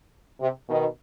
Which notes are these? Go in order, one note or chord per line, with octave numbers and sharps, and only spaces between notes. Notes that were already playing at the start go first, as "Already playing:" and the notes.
C3
B2 D#3